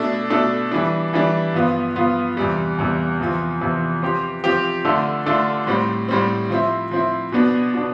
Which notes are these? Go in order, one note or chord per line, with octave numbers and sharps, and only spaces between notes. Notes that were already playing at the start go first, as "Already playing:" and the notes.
Already playing: B2 A3 D4 A4
B2 A3 D4 A4
E3 G3 D4
E3 G3 D4
G2 F3 B3 F4
G2 F3 B3 F4
E2 C3 G3
E2 C3 G3
E2 C3 F3
E2 C3 F3
F3 C4 G4
F3 C4 G4
D3 A3 D4 F4 A4
D3 A3 D4 F4 A4
A2 G3 C4
A2 G3 C4
F3 C4 E4
F3 C4 E4
B2 B3 D4
B2 B3 D4